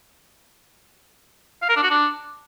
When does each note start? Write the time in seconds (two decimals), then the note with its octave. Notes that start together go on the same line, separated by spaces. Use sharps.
1.62 F5
1.69 A#4
1.76 D4
1.83 F#4
1.90 D4